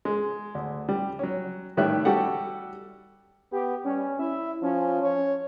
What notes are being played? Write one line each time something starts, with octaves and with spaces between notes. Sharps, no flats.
G#3
D2
G3
F#3 C#4
A2 D#3 G3 C#5 E5 F#6
G3 F#4 G4 A4 F#5
B3 G4
G3 C#4
E4 E5
F3 C#4
C#5